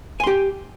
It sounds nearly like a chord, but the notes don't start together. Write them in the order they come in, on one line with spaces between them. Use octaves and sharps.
G#5 C6 G4